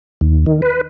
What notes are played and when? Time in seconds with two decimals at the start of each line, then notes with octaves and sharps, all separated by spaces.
0.21 D#2
0.46 D#3
0.62 B4